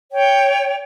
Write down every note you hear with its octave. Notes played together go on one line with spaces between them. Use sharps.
C#5 G5